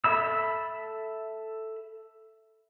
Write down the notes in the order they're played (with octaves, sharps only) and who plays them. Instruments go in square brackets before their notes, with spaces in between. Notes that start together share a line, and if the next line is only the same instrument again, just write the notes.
[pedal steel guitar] A4 E5 B5 E6